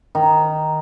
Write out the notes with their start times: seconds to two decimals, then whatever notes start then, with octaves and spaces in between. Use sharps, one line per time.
0.15 D#3